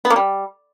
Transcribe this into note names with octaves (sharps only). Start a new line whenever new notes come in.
B3
A#3
G3